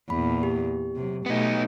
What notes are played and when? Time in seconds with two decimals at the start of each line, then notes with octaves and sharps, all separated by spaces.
0.10 E2 A#2 B5
0.43 G4
0.96 C3 F#3
1.26 B2 A3 B3 D#4